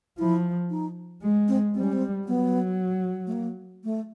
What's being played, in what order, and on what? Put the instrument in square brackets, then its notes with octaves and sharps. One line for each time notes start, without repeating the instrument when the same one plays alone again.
[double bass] F3 [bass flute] E4
[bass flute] D#4
[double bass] G#3
[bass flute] C4
[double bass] G3 [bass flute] C4
[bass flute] C#4
C4
[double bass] F#3 [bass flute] B3
[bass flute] A3
A#3
A3